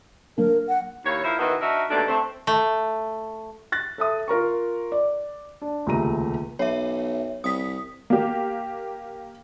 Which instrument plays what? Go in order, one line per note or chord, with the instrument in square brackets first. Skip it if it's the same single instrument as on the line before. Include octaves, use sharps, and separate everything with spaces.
[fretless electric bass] F#3 A#3 D4 [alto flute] A#4
[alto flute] F#5
[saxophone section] D#2 E4 F4 C#5
F3 E4 A#4 E5
B2 D#3 E3 D#4 F#4
D4 D#4 F#4 A#4 E5
D#2 B2 D3 A3 D4 D5
A3 C4
[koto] A3
[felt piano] F#6 A6 A#6
A4 E5 D#6
F4 A#4 A#5 C#6
D5
D4
D#1 C#2 C3 A3 A#5 D#7
[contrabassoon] B1 [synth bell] C#5 E5
[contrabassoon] C2 [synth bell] D#6 B6
[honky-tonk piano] A#3 G4